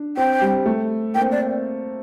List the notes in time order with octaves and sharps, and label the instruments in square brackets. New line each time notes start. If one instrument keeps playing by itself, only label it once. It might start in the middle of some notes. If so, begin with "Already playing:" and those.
Already playing: [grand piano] D4
[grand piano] C4 [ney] G5
[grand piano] G3
A3
[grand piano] A#3 [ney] G5
[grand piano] C4
[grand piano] A#3 [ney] D5